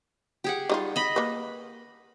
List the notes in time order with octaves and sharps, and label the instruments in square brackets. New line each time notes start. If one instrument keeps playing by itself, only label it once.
[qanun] G4 G#4 F#5
[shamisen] G3 D#4 F4
[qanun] D#5 B5
[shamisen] A#3 B4